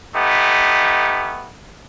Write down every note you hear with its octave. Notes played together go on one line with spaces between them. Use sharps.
A3 B3 D#4 G4